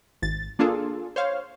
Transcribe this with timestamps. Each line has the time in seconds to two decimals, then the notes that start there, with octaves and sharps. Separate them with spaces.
0.22 G#1 A6
0.59 A#3 D4 F4 G#4 A4
1.16 C5 C#5 F5